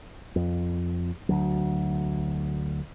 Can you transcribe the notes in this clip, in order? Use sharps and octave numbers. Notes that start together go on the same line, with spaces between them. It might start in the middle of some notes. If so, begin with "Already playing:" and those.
F2
D2 F#3